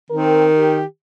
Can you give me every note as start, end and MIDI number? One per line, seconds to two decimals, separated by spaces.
0.10 0.82 51
0.10 0.46 60
0.10 0.71 70
0.53 0.85 67